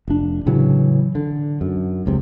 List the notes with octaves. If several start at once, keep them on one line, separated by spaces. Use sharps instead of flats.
F1 D4
A2 C#3 E3 F#3
D3
F#2
F1 C#2 C3